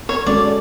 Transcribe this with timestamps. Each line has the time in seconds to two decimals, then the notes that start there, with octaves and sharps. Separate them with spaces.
0.09 C#5
0.26 G#3 C#4 F#4 A4 D5